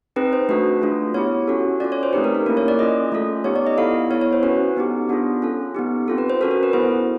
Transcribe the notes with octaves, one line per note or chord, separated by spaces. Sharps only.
C4 D#4 G#4 B4
C5
A3 D4 F#4 A4 B4
A3 D4 F4 G#4
B3 E4 G4 C#5
C#4 F#4 A4
C#4 F4 A4 D5
C#5
C5
A3 C4 D#4 G4 B4
A#4
A#4
A#3 C#4 E4 A#4
C#5
D5
C#4 F4 G#4 D#5
A3 C#4 F4 A4
B3 D#4 G4 C#5
D5
D#5
B3 E4 A4 F5
B3 E4 A4 C#5
C#5
C5
C#4 F#4 A4 B4
B3 D#4 G4
B3 D4 F4 G#4
C#4 F4 A4
B3 D#4 G4
C4 F4 A4
B4
C5
C#4 F#4 A4 A#4
A#4
B4
B3 E4 G#4 C5